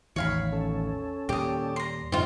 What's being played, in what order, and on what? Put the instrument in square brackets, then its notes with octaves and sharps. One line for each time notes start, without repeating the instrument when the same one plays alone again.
[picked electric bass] A1 E2 D#3 [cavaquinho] C#5 F5 B5
[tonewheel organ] C#4 A4
[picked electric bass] D#2 A#2 G3 [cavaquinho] G4 D#6
[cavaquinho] A#5 C6
[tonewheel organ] F#2 D3 D#4 [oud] C4 F4